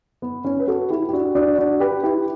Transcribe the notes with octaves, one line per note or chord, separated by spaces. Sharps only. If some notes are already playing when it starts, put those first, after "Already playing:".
B3
C#4
B4
F#4 A4
E4 G4
G4
D4 F#4
D4 F#4
D4 F#4
G4 B4
E4 G4